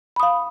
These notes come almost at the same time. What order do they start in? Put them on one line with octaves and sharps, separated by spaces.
B5 D#6 F5